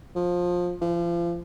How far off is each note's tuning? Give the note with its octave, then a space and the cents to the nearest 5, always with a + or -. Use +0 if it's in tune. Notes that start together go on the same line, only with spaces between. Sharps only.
F3 +20
F3 -35